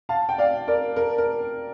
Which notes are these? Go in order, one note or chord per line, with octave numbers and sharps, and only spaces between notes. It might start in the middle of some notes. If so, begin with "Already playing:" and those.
F5 A5
G5
D5 F5
A#4 D5
A#4
A#4